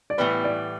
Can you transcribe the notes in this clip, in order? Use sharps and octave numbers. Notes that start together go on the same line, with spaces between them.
D5
A2 E3 G3 B3 B4
D5